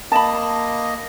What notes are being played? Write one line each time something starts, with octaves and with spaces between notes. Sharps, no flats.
A#3 D#5 A5 B5